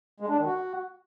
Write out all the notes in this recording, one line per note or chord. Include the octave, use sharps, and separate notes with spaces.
G#3
D4
D#3
F#4